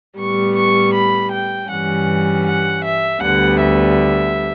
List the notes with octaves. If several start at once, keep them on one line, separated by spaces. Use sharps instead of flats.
A2 G3 B3 C#6
C#6
B5
G5
G2 E3 G3 C#4 F#5
F#5
E5
D2 D3 G3 B3 F#5
E5